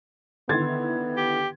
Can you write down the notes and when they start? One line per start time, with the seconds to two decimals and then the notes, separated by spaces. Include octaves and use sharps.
0.49 D3 D#3 B3 E4 C6 G#6 A6
1.17 G4